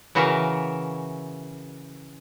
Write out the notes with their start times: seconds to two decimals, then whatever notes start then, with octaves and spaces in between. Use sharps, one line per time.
0.15 C#3 E3 F#4 A#4 E5 F5